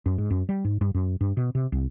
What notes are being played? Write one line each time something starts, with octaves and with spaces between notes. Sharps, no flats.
F#2
G#2
F#2
G3
G#2
G2
F#2
G2
B2
C3
C2